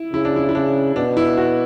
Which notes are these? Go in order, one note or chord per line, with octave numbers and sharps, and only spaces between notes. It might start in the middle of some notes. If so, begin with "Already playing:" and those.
Already playing: E4
C#3 E4
D4
E4
E4
C#3 D4
B2 D4
E4
F#4